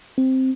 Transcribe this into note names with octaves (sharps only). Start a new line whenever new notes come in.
C4